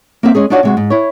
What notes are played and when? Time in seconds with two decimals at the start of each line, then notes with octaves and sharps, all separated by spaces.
0.23 A#3 C4 E5
0.35 G#3 C#4 G#4
0.50 D4 D#4 F4 F#4 C#5 D5
0.63 C3 G#3 F#4
0.77 G#2
0.90 E4 C#5